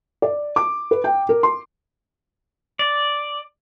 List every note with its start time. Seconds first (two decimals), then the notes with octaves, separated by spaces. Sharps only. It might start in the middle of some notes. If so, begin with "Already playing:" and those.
0.22 D5
0.56 D6
0.91 B4
1.04 G5
1.29 A#4
1.43 C6
2.79 D5